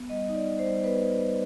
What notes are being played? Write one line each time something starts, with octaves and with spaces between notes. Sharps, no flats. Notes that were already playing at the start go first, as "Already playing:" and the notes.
Already playing: B3
G3 D#5
D#4
D5
G3
C5
G3
B3 B4
G3
G3